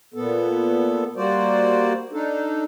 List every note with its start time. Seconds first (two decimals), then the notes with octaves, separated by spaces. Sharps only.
0.14 A#2 B3 A4
1.16 G3 A#3 F#4 C5 D5
2.12 D4 D#4 A4